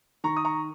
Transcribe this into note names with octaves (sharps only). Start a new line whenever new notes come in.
D#3 A#5 C#6
D#6
A#5 C#6